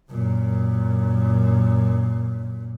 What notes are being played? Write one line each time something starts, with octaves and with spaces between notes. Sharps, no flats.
F#2 A#2